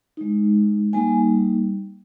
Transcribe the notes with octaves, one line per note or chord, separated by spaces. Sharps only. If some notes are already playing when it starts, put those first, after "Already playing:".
G#3 D#4
G3 A#3 D#4 G#5